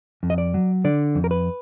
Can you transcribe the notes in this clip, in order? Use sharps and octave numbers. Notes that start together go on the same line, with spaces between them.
F2
D#5
D5
F#3
D3 D5
F2
A#4
B4